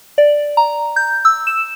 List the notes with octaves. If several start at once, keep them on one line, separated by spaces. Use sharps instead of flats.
D5
A#5
G6
E6
E7